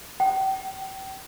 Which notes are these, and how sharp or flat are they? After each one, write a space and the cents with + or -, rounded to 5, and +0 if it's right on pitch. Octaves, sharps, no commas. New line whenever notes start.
G5 -35